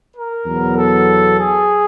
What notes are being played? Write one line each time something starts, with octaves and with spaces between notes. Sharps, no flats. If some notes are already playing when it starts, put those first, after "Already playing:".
A#4
E2 B2 F#3 B3
A4
G#4